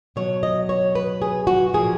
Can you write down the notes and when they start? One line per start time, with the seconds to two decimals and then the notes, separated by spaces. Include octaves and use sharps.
0.16 B2 F#3 C#5
0.43 D#5
0.69 C#5
0.95 B4
1.22 G#4
1.47 F#4
1.74 A#2 F3 G#4